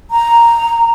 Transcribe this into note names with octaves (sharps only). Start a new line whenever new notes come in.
A#5